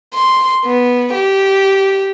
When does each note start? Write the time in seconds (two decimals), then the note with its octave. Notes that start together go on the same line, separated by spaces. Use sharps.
0.14 C6
0.66 B3
1.14 G4